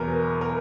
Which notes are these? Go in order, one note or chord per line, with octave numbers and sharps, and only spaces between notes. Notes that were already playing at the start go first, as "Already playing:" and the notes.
Already playing: E2 B2 F#3 A#4
A#4